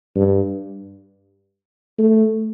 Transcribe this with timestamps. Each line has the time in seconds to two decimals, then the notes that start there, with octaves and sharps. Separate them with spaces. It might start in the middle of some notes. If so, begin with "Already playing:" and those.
0.16 G2
1.99 A3